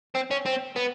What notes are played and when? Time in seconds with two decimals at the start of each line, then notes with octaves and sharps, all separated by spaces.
0.15 C4
0.31 C#4
0.46 C4
0.76 B3